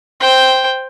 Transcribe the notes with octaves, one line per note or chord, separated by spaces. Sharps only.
C5 G5